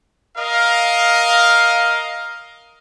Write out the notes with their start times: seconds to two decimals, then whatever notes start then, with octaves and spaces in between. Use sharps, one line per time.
0.38 A#4 D#5 F5